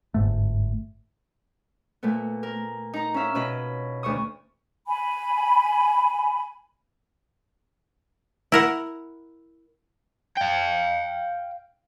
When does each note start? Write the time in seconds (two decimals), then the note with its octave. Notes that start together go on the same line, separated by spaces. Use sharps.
0.14 G1 G#2 A3
2.03 A#2 A3 B3
2.43 A#4
2.94 D#4 A#5
3.14 C#4 E4 E5 F5
3.35 B2 C#4 D#5 B5
4.03 D2 E3 C#6 D#6
4.87 G#5 B5
8.52 E4 A#4 F#5
10.37 F5 G5